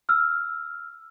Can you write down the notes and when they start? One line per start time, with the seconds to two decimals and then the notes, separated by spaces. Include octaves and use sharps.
0.09 E6 F6